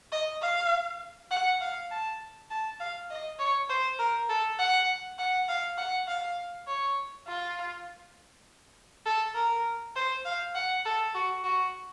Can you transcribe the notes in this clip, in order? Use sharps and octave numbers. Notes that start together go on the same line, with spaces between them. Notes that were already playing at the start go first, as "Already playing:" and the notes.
D#5
F5
F#5
F5
A5
A5
F5
D#5
C#5
C5
A#4
A4
F#5
F#5
F5
F#5
F5
C#5
F4
A4
A#4
C5
F5
F#5
A4
F#4
F#4